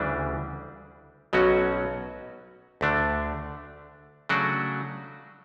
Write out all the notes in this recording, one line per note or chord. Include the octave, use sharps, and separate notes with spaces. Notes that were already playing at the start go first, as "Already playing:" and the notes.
Already playing: D2 C#3 E3 G3 D4
B1 B2 F#3 C#4 F#4
D2 D3 A3 D4
C#3 F#3 A3 D4 F#4